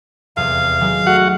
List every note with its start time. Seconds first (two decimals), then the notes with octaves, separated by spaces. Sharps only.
0.37 F1 E2 F5
0.81 D#3 F#3 G#3
1.07 A3 F#4 F#5